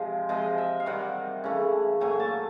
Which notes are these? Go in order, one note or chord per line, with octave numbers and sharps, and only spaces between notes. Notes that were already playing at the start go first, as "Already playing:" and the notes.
Already playing: C3 F3 G#3
C3 F3 G#3 D#5
E5
F5
C3 D#3 G3 F#5
C#3 E3 A3
A#2 F#3 A3 G#5
A5